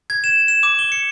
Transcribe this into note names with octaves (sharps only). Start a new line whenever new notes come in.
G#6
E7
E7
D6
G7
C#7